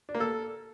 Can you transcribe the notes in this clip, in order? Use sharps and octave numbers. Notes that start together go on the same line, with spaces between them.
D4
A#3
A4